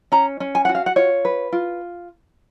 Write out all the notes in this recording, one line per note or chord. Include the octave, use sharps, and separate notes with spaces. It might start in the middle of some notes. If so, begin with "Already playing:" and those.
C#4 A#5
C#4
G#5
F#4 F#5
F5
F#5
F4 C#5
B4
F4